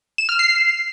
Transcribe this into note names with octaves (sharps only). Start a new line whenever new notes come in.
E7
F6
C7